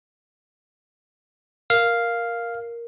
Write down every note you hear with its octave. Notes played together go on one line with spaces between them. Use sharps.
A#4 F5